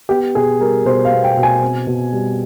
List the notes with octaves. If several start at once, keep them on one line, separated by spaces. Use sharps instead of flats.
B3 G4
B2 G#4
G3 A#4
B2 C5
F5
B3
G5
B2
G#5
C4
B2
G3